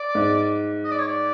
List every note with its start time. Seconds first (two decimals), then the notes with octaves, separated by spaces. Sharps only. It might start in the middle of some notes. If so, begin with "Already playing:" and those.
Already playing: D5
0.15 G#2
0.84 D#5
0.91 D5
0.99 C#5
1.07 D5